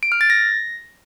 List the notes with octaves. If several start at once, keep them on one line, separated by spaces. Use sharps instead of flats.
D7
F6
A6
A#6